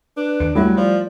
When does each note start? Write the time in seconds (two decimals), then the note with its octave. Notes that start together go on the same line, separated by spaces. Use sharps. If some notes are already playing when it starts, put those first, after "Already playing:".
0.17 D4 B4
0.40 D#2 D7
0.55 F#3 G3 A3 E4 B5
0.77 F3 D5